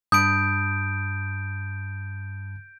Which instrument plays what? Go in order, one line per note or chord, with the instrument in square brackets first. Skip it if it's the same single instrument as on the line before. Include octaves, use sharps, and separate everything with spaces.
[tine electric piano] G2 A5 B5 [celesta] D#6 [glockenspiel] G6 D7